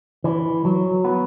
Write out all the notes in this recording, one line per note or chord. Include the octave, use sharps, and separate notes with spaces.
E3
F#3
B3